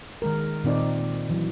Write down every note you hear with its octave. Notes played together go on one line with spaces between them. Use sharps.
D#3 G#3 A#4
A#2 D#3 C4 D#4 D5
E3 F#3